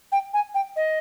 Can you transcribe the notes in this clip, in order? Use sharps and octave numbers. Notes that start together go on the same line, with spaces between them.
G5
G#5
G5
D#5